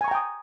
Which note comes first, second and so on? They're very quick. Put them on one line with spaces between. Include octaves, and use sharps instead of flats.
G#5 C#6 A#5 G5 D#6